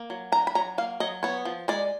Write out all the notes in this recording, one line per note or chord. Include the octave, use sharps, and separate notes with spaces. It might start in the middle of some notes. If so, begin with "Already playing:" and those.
Already playing: A#3
F#3
D4 A#5
B5
F#3 A#5
A#3 F5
F#3 D#5
B3 C#5
F3
G#3 D5